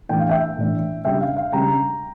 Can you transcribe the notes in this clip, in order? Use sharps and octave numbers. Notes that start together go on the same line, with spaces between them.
A2 E3 A3 D4 G5
F5
E5 G5
A2 E3 A3 D4
C#3 G3 D4 E5 G5
F5
F5
C#3 G3 D4 G5 A#5